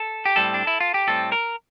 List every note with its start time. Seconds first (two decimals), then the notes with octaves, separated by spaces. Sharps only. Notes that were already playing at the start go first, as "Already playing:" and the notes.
Already playing: A4
0.25 G4
0.36 A2 G3 C4 A4
0.54 D4
0.67 E4
0.80 F4
0.94 G4
1.08 A2 G3 C4 A4
1.32 A#4